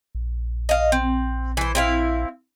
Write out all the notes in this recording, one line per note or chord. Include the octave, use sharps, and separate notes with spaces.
A#1
D#5 F5
C4
E3 C5
C4 E4 F5